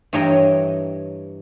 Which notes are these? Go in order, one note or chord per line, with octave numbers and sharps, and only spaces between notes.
G2 E3 C#5 D#5 G5 A#5